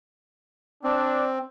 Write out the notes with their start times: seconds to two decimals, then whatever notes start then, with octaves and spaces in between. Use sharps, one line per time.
0.84 C4 D4